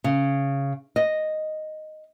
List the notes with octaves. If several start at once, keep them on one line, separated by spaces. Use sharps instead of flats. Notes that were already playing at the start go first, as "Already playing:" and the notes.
C#3
D#5